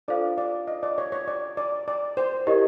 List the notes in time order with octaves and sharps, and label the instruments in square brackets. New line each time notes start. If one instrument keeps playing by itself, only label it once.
[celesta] D4 F4 A4 C5 F5 [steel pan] D5
[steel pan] D5
D#5
D5
C#5
C#5
D5
D5
D5
C5
[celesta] E4 G4 A#4 D#5 [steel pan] C#5